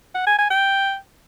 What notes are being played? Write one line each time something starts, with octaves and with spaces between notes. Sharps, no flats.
F#5
G#5
G#5
G5